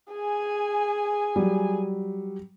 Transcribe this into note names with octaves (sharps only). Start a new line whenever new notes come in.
G#4 G#5
F#3 G3